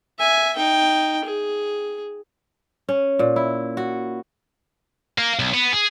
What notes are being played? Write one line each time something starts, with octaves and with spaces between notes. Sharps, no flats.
E5 G#5
D#4 G5
G#4
C#4
A#2
E4
F#4
A#3
B1
B3
G#4